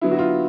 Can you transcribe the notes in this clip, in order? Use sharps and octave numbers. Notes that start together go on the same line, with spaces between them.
D3 F#3 B3 E4
F#4
F4